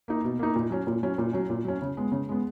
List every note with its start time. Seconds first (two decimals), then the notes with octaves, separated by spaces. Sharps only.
0.08 A#3 D#4
0.24 B2
0.39 A#3 D#4
0.56 A#2
0.71 F#3 C#4
0.87 A#2
1.03 F#3 C#4
1.18 A#2
1.33 F#3 C#4
1.50 A#2
1.65 F#3 C#4
1.82 C#3
1.97 G#3 B3
2.12 C#3
2.29 G#3 B3